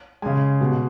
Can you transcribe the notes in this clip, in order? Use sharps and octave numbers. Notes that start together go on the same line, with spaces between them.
C#3 G#3 G#5
B2 G#3